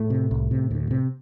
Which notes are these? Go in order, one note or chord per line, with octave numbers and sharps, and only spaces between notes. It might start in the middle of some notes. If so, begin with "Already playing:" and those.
Already playing: A2 A3
C3
C2
C3
D2
C3